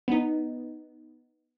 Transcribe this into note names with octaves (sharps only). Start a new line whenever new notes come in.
B3 D#4